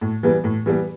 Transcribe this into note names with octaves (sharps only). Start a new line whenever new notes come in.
A2
E3 G3 B3
A2
E3 G3 B3